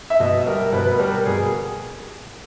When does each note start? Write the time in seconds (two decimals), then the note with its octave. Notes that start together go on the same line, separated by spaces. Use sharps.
0.10 E5
0.20 B2 D#5
0.46 G3 A#4
0.72 B2 B4
0.86 B4
0.99 G3 A#4
1.12 A#4
1.26 B2 G#4